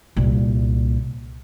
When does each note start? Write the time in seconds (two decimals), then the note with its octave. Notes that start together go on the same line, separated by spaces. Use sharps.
0.16 C2 A#2